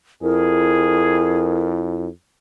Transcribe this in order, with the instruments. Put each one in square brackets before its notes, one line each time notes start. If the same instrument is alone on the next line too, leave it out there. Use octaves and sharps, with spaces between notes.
[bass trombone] F2 [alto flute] E4 [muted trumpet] G#4 [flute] A#4